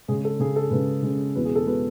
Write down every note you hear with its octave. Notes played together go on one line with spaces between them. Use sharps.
C#3 G#3 C#4 G#4
A4
C#3 G#3 C#4 G#4
A4
C#3 G#3 C#4 B4
C#3 G#3 C#4
E2 B2 G#3 B4
G#4
A4
B2 G#3 B4